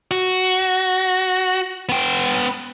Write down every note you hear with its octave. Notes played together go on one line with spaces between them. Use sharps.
F#4
B3 G5